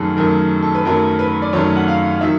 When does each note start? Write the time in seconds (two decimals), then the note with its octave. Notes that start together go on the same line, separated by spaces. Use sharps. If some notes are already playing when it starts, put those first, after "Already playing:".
Already playing: F#2 D#3 F#3 A3 G#4 A4
0.17 F#2 D#3 F#3 A3 A#4
0.63 A4
0.75 B4
0.85 F#2 D#3 F#3 A3 A#4
1.19 B4
1.42 D5
1.53 F#2 D#3 F#3 A3 C#5
1.77 F#5
1.88 F5
2.21 D#3 F#3 E5